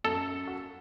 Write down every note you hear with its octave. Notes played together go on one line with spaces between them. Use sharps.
F#2 A4
F#4